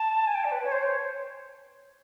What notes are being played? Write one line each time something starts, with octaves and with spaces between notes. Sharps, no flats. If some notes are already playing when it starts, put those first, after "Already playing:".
Already playing: A5
G#5
G5
D5
B4
C#5
C5
C#5